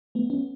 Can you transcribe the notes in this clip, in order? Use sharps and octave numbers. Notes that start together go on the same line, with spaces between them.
A3 B3
B3 C#4